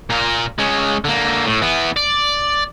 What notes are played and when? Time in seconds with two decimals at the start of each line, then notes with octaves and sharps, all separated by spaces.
0.10 A#2 A#4
0.59 G#3 C#4
1.05 D3 A#3
1.46 A2
1.62 E3 B3
1.96 D5